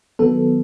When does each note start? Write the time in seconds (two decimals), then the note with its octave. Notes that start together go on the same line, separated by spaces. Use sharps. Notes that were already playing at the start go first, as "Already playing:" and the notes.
0.19 D#3 F#3 B3 A4